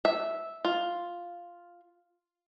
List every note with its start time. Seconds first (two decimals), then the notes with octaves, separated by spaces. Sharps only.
0.05 E5
0.65 F4